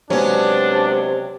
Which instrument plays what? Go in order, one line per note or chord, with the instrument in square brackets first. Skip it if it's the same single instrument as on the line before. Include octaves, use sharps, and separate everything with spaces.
[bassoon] C3 [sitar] F#3 C#4 [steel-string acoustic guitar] G#3 B3 [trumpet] D4